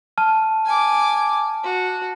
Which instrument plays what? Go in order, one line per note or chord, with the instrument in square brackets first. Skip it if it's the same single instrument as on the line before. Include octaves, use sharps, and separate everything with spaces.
[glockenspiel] A5 F6
[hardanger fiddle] G#5 D6
F#4